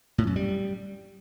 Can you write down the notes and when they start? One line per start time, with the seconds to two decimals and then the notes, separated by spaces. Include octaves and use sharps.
0.18 A2
0.27 F#2
0.36 G3